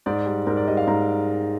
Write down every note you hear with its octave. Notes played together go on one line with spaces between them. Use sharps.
G#2 D5
G3
G#2 A#4
D5
G3 D#5
F5
G#2 A#5